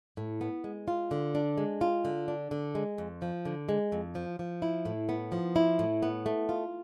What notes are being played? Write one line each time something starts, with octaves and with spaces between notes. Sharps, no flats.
A2
B3
G#3
F4
D3
D4
G#3
F4
D3
D4
D3
G#3
F2
F3
D3
G#3
F2
F3
F3
E4
A2
B3
F3
E4
A2
B3
A3
F4